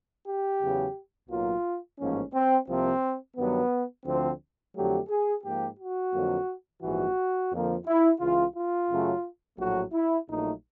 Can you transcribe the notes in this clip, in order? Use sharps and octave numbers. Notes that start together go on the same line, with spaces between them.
G4
E2 C#3 F#3
B1 A2 F#3 A#3 F4
A1 G#2 F3 A#3 C#4
C4
C2 C3 F3 A#3 C4
G2 D#3 F#3 B3
D2 D3 F3 C4
F2 D3 F#3 A3 G4
G#4
G#2 F3 A#3 G4
F#4
F2 D3 F#3 A#3
A#1 G#2 E3 G3 F#4
F2 D3 F3 A#3
E4
C#2 C#3 E3 F4
F4
F#2 C#3 F#3 A3
A#1 A2 F#3 A3 F#4
E4
A#1 A#2 F#3 A3 D#4